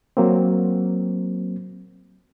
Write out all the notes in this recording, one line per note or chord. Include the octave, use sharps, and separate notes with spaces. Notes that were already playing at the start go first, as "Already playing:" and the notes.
F#3 A#3 C4